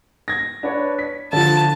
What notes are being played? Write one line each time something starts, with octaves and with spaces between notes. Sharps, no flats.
G#6 A#6
D4 B4 C#5
B6
D3 F3 A5